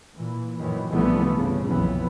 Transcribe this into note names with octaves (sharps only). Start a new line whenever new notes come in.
A#2 E3
F#2 A#2 D#3 E3
C2 D3 E3 F3 A3 B3
G1 C#3
F#1 B1 F2 E3 B3